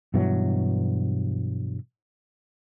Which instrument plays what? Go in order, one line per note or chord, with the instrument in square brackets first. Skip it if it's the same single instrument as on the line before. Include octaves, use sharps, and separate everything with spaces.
[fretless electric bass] G2 B2 E3 F#3